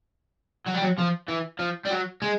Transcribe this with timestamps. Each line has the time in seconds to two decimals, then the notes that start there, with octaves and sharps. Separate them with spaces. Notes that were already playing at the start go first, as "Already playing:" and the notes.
0.67 F#3
0.75 G3
0.82 F#3
0.98 F3
1.28 E3
1.59 F3
1.85 G3
1.91 F#3
2.22 G#3